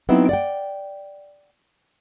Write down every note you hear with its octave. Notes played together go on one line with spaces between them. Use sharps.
F#3 B3 C4 D#4 E4
D5 F#5 G5